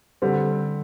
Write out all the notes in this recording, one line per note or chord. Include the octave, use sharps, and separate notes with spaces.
D3 G3 C4